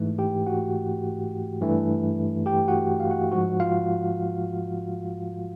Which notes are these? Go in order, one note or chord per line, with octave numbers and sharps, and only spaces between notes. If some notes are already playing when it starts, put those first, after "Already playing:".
Already playing: G#2 E3 A3
G4 G5
F#4 F#5
G2 E3 A3
G4 G5
F#4 F#5
F5
F#4 F#5
G#2 F3 G#3 F#4 F#5
F4 F5